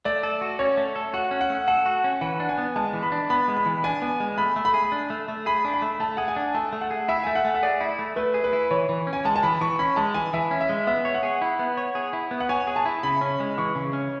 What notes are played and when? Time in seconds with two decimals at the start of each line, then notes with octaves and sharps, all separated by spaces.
0.05 A3 D5
0.23 A4
0.41 F#4
0.59 C#4 C#5
0.77 A3
0.96 A4
1.14 F#4 F#5
1.31 C#4
1.41 F#5
1.50 A3
1.68 A4 F#5
1.86 F#4
2.04 C#4
2.21 E3 F#5
2.40 D4
2.49 G#5
2.58 B3
2.76 G#3 A5
2.94 E3
3.03 B5
3.12 D4
3.30 B3 B5
3.48 G#3
3.57 B5
3.66 E3
3.84 D4 G#5
4.02 B3
4.20 G#3
4.38 A3 B5
4.56 A3
4.65 B5
4.74 G#4
4.92 D4
5.10 A3
5.28 A3
5.46 G#4 B5
5.65 D4
5.74 B5
5.82 A3
6.00 A3 A5
6.17 G#4 F#5
6.28 G#5
6.36 D4
6.54 A3 A5
6.73 A3
6.81 F#5
6.91 G#4
7.08 E4 E5
7.24 A3 G#5
7.35 F#5
7.45 A3
7.55 E5
7.63 G#4 D5
7.81 E4
7.99 A3
8.16 A3 B4
8.34 G#4
8.44 B4
8.53 E4
8.71 E3 C#5
8.89 E3
9.07 C#4
9.13 G#5
9.25 G#3 A5
9.36 A5
9.43 E3 B5
9.61 E3 C#6
9.79 C#4 B5
9.96 G#3 A5
10.14 E3 G#5
10.33 E3 E5
10.51 C#4
10.61 E5
10.69 G#3
10.87 B3 E5
11.05 C#5
11.14 F#5
11.23 G#4
11.42 E4
11.59 B3
11.77 C#5
11.95 G#4
12.13 E4
12.31 B3
12.40 F#5
12.49 C#5 G#5
12.67 G#4
12.76 A5
12.86 E4
13.03 C#3 B5
13.21 C#4
13.40 G#3
13.58 E3 C#6
13.75 C#3
13.93 C#4